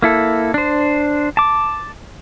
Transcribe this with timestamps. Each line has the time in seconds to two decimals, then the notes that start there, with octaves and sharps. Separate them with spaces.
0.02 A#3 E4 A4
0.54 D4 C5
1.37 A5 D6